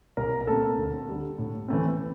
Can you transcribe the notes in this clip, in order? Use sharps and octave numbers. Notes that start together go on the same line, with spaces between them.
C2 A#4 A#5
A#5
A#2 A3 C4 A4 A5
D2
D3 G3
A2
E3 A3 C4